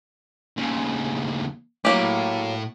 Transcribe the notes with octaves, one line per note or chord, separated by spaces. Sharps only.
D#2 C#3
A2 F#3 A#3 G4